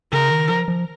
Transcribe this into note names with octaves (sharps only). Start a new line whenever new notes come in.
C#3 A#4
D#3
F3
F3